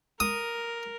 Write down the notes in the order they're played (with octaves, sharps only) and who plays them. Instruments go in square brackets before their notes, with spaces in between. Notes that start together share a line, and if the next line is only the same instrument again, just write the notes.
[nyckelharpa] A#4 [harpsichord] D#6